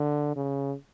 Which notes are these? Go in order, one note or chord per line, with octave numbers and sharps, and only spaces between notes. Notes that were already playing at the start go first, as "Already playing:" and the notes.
Already playing: D3
C#3